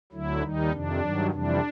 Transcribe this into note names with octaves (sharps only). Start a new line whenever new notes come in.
D2 D3 F#3 E4
D#2 D#3 G3 D#4
F2 C3 D#3 D4
G2 D#3 F#3
F2 C3 E3 G3 D4